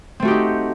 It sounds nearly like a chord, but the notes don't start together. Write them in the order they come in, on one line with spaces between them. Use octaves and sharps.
C4 A3 F#4 G4 D#4